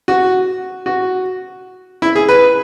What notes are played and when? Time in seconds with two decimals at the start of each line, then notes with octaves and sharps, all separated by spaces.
0.08 F#4
0.86 F#4
2.02 E4
2.16 G#4
2.29 B4